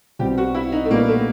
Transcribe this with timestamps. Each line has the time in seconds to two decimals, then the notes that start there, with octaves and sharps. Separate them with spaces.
0.19 B1 B2 G3 C4 G4
0.38 F#4
0.54 E4
0.72 D#4
0.85 A3
0.90 A#2 G3 A#3 B3 D4 F#4
1.08 A3